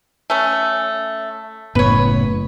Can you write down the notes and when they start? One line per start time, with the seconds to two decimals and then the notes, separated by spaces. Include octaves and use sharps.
0.30 A3 C#4
1.75 F#1 A2 B3 B4 C#5